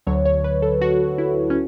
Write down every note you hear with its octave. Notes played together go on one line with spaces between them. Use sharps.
D2 D3 F#3 C#5
C#5
B4
A4
F#4
E4
C#4